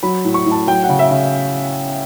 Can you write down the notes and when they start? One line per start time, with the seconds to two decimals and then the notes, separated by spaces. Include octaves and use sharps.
0.03 F#3 B5
0.25 A2
0.34 C#6
0.46 A2
0.52 A5
0.67 F#3 G5
0.84 F#5
0.89 C#3
0.99 E5
1.11 C#3